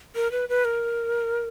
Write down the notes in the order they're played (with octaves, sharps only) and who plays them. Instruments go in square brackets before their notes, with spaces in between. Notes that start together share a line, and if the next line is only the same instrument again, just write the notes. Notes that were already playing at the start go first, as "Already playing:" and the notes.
[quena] A#4
B4
B4
A#4